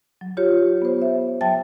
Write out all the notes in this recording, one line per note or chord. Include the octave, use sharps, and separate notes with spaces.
F#3
F4 G4 C#5
B3 C5
E5
F#3 E5 G5 A5 A6